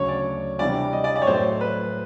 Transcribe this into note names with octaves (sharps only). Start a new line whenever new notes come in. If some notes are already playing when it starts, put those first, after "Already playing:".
Already playing: D2 C#3 F#3 C#5
D5
C3 E3 G3 B3 D4 D5
D#5
D5
D5
C#5
A2 F#3 A3 C5
B4